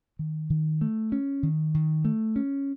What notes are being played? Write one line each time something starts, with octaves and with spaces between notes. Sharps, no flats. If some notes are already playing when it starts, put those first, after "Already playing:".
D#3
D#3
A3
C#4
D#3
D#3
A3
C#4